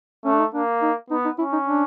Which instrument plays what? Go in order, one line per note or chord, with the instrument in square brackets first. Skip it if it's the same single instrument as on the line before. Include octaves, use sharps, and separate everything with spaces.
[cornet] A3 [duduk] C#4
[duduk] D4
D#4
[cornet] A#3 [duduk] D4
[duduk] D#4
[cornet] B3 [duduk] D#4
[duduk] D#4
[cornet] C#4 [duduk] E4
[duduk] D#4
D4